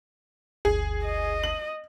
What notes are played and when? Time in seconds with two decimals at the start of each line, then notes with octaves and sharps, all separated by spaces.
0.65 G1 D2 G#4 C7
1.05 D#5
1.43 F#7